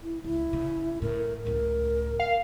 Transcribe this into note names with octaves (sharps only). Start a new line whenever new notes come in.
E4
C#2 E4
C#3
A2 A#4
C#2 A2 A#4
F5